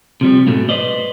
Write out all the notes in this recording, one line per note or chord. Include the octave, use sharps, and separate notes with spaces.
C3 F3 G3
G#2 B2 A3
B4 C5 D5 D#5